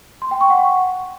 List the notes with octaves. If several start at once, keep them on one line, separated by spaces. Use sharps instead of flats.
C6
G5
C#6
F#5